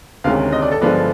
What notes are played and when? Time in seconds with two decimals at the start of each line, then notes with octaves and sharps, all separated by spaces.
0.24 D2 C3 D#3 G#3 C#4 F5
0.53 D#5
0.62 D5
0.72 A4
0.81 G2 D3 F3 G#3 B3 D5